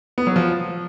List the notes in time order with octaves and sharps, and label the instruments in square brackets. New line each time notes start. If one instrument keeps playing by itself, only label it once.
[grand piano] B3
F#3
F3